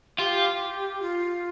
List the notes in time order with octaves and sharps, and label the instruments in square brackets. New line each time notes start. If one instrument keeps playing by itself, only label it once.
[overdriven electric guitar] F4 [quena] G4
[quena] F4